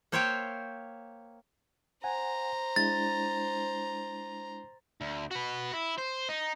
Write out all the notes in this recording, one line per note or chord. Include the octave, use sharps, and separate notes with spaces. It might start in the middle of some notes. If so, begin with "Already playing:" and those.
A#3 C5 C#5 E5 F5 G5
C5 F#5 G#5 A#5
G#3 D4 E4 A6
D2
F#4 B4
E4
C5
D#4